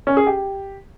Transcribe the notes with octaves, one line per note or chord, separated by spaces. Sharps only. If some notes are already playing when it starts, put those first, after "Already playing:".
C#4
G#4
G4